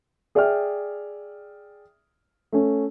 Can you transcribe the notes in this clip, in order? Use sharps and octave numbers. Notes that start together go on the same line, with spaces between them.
G#4 D5 E5 G5 F6
A3 C#4